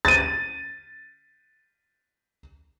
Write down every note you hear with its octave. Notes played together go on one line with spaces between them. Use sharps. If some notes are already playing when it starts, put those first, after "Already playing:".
A6 D#7